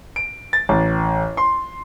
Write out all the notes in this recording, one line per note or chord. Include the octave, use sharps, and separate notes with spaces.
D7
A6
A1
C6